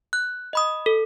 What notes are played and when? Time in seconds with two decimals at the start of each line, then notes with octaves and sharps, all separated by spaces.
0.13 F#6
0.53 D#5 B5 D#6
0.86 A4